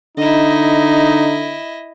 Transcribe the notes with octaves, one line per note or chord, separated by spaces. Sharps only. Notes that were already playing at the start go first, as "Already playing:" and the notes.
D3 D#4 E4 D#5